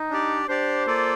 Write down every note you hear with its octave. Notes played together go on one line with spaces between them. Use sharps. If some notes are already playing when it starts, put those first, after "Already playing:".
Already playing: D#4
D4 G4 D5
D4 G4 C5 D5
A#3 F4 A4 D5